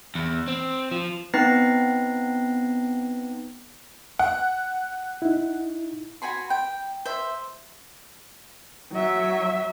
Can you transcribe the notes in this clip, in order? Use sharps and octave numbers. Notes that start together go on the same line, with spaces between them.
E2
C4
F3
B3 C4 D#4 B4 A#6 C7
F#5
D#4 E4
F#4 G#5 B5 C6
G5
C5 E5
F#3 E5